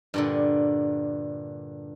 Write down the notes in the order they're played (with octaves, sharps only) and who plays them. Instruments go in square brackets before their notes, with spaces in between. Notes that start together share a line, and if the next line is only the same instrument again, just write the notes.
[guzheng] G2 A#2 D3